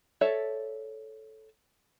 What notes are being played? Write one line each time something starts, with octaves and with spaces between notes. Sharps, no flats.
A4 C#5 D5 E5 A5